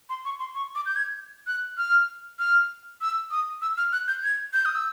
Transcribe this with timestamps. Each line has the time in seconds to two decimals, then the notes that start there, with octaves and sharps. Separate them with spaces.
0.09 C6
0.25 C#6
0.39 C6
0.55 C#6
0.75 D6
0.86 G6
0.96 G#6
1.47 F#6
1.78 F6
2.39 F6
3.01 E6
3.31 D#6
3.62 E6
3.77 F6
3.93 F#6
4.08 G6
4.24 G#6
4.53 G6
4.65 D#6
4.75 E6